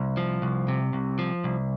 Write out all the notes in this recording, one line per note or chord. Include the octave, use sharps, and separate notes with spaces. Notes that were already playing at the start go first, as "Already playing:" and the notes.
Already playing: C2
F3
C2
C3
C2
F3
C2